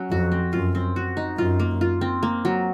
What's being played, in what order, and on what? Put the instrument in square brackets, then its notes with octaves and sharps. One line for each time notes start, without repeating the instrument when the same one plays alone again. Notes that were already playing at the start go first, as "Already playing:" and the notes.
Already playing: [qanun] F#3 C#4
[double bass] F2 [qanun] F#4
[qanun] C4
[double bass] F#2 [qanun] F4
[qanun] C4
F#4
D#4
[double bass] F#2 [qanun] F4
[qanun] A#3
F4
C4
A#3
F#3